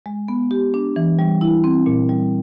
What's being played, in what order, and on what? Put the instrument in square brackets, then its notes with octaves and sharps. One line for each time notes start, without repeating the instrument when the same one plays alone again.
[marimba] G#3
B3
G4
D4
E3
G3
E4
C4
A#2
G3